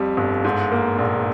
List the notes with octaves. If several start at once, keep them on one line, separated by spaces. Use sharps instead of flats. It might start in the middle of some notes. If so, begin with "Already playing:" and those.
Already playing: F2 G3
G1
G#2
A#3
A#1